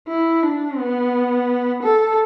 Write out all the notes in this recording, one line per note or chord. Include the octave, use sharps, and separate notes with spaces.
E4
D4
B3
A4